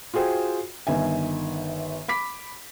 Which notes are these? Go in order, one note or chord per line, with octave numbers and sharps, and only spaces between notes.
F4 F#4 G#4 C5 G5
G1 D#3 E5 G#5
B5 D6 B6